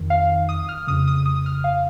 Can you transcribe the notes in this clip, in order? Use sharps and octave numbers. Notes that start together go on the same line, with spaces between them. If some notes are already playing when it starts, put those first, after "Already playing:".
Already playing: F2 D#3
F5
D#6
F6
F2 C#3 D#6
D#6
D#6
F6
F5